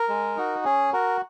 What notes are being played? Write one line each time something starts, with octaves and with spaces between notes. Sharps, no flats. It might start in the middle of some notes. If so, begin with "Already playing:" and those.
Already playing: A#4
G#3
D#4 F#4
C#4 G#4
F#4 A#4